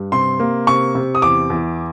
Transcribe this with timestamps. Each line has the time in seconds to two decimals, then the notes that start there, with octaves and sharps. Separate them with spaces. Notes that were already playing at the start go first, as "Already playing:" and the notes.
Already playing: G2
0.12 C3 C6
0.40 A#3
0.67 C3 C#6
0.95 C3
1.15 D#6
1.22 E2 D6
1.50 E2